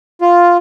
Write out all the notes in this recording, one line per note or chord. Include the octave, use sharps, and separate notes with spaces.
F4